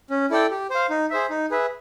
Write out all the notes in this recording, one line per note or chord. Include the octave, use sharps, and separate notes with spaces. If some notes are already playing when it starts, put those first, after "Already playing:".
C#4
E4 A4 D5 G5
G4
C5 F5
D#4
G#4 C5 E5
D#4
G#4 B4 E5